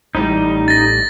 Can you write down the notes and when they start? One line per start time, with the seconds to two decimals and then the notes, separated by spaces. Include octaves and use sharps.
0.15 A1 A2 G3 D#4
0.68 A6 A#6